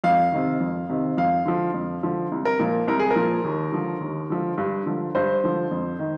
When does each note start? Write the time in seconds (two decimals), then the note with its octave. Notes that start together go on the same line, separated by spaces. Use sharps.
0.04 F2 F5
0.32 C3 D#3
0.60 F2
0.89 C3 D#3
1.17 F2 F5
1.46 D3 F3
1.74 F2
2.03 D3 F3
2.32 C2
2.45 A#4
2.59 A#2 F3
2.88 C2 A#4
2.99 G#4
3.11 A#4
3.16 A#2 F3
3.45 D#2
3.72 D3 F3
4.01 D#2
4.30 D3 F3
4.58 G2
4.86 D3 F3
5.15 G2 C5
5.44 D3 F3
5.71 F2
5.99 D#3